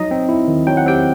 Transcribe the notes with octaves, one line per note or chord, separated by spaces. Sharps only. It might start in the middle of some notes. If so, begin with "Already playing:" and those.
Already playing: F#3 D#4 D#5
C4
E4
D#3
F#3 G5
F#5
C4 G4 G5